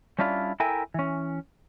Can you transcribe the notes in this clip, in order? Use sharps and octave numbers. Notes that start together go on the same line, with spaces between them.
G3 C#4 D4 E4 F4
E4 A4 A#4 E5 G5 G#5
E3 C#4